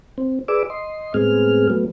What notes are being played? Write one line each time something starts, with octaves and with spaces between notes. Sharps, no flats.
C4
G#4 B4 D5 D6 E6
D#5 C6
A2 G#3 B3 C4 G#4 F6
F#3 A3 B3